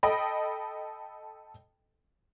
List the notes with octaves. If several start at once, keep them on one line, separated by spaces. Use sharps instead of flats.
A4 D#5 G5 B5